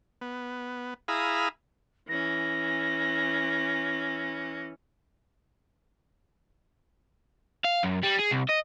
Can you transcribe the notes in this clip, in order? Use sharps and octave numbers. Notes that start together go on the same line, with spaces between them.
B3
E4 G#4 F5 A#5 B5 D#6
E3 C#4 A#6
F5
F#2
G3
G#4
C2
D#5